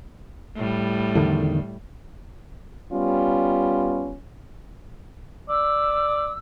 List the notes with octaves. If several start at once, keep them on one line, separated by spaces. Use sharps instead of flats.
A2 G3
E2 D3 D#3
G3 B3 C#4 F4
D5 E6